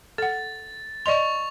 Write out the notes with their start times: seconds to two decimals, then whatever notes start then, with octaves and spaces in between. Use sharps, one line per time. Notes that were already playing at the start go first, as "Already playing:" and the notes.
0.18 A4 F#5 A6
1.06 D5 D#5 C6 C#6 F7